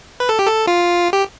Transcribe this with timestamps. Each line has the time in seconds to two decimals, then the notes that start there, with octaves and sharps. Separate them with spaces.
0.20 B4
0.29 A4
0.39 G4
0.47 A4
0.67 F4
1.13 G4